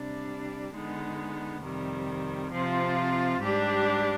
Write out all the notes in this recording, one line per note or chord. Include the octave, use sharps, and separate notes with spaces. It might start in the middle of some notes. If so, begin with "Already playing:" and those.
Already playing: C3 G3 D4
D3 G#3 B3 D#4
F2 C3 D#3 G3
C3 F3 C4 F4
G#2 G3 D4 G4